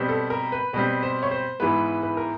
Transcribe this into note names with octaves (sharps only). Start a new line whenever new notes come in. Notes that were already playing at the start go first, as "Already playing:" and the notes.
Already playing: B2 G3 C4
A4
A#4
B4
B2 G3 C4 B4
C5
C#5
C5
G#2 E3 G#3 B3 B4
B4
A#4